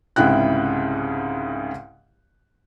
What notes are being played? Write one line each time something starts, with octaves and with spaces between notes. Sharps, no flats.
C2 G#2 C#3 E4 G5 F#6